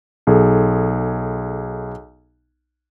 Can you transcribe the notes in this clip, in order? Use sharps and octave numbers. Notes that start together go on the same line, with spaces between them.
B1 G#4 A4